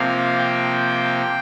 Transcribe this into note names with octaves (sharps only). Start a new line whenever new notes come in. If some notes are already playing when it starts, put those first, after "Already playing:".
Already playing: C3 F3 A#3 F5
G5